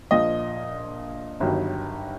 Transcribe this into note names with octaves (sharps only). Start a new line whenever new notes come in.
A#1 A#2 F3 D#5
G1 G2 D#3 F#3